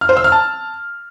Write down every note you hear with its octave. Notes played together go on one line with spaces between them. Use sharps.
F6
C5
E6
F6
A5